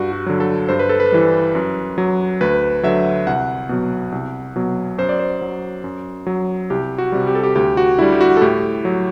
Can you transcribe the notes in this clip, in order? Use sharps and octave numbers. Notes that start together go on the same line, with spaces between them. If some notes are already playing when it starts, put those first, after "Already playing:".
Already playing: G2 F#4
F#4
D3 F#3
A4
G2 C5
B4
A4
B4
E3 G3
F#2
F#3
D2 B4
D3 F#3 E5
C2 F#5
B2 F#3
C2
B2 F#3
F#2 C5
D5
C5
F#3
F#2
F#3
C2 G4
F#4
C3 G3
G4
A4
G4
D2 G4
F#4
D3 G3 E4
G4
F#4
A4
A2 G4
F#3